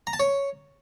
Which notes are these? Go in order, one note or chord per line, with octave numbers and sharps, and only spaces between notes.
A#5
A5
C#5